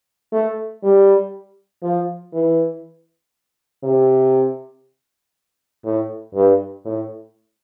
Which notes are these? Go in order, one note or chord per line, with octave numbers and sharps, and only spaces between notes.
A3
G3
F3
E3
C3
A2
G2
A2